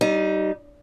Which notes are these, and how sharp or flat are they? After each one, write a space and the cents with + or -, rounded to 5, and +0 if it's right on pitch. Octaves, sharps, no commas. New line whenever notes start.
G3 -25 D#4 +0